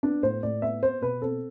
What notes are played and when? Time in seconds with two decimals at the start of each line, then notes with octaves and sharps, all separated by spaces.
0.03 B3 D4
0.23 A2 C5
0.43 A2 D5
0.62 B3 E5
0.83 B3 C5
1.02 B2 B4
1.21 C4 A4